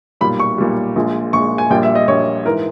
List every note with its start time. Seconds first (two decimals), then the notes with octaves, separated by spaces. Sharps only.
0.21 B1 A#2 G3 B5
0.40 C#6
0.58 B1 A#2 G3
0.96 A#1 A#2 G#3
1.33 A#1 A#2 G#3 C#6
1.58 G#5
1.70 A#1 A#2 G3 G5
1.83 E5
1.95 D#5
2.08 A#1 A#2 G3 C#5
2.45 G#2 E3 A#4